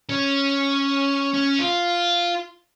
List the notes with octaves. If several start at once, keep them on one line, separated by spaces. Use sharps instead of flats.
C#4
C#4
F4